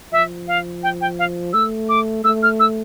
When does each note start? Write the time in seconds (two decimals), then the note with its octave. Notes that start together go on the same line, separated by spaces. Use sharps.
0.12 F3 E5
0.48 F5
0.83 G5
1.01 G5
1.19 F5
1.53 A3 E6
1.89 D6
2.24 A3 E6
2.43 F6
2.60 E6